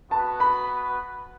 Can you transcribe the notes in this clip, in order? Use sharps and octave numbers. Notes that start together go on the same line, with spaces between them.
B3 F#4 B4 A5
B5